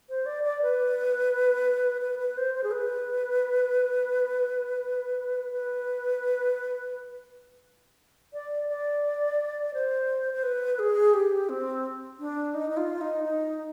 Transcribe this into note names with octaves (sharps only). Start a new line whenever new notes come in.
C5
D5
D5
B4
B4
B4
C5
C5
G#4
B4
B4
D5
D5
C5
C5
B4
G#4
G4
C4
D4
D#4
D#4
F4
D#4
D#4